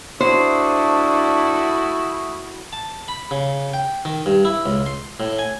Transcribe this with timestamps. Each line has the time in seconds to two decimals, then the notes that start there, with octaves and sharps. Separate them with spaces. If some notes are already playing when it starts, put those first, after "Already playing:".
0.20 A3 D4 E4 F#4 C5 C#6 D#6
2.73 A5
3.08 B5
3.31 C#3
3.73 G5
4.05 D#3
4.26 G2
4.45 E4
4.66 C#2
4.86 C6
5.20 A2
5.39 G#5